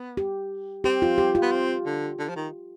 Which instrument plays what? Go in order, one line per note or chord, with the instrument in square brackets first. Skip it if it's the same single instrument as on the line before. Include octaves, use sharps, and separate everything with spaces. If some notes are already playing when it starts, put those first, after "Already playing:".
Already playing: [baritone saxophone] B3
[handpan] G4
[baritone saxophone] C4 [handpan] G4
[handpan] F4
G4
F4
[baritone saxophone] B3
C4
D3
D3
F3
D#3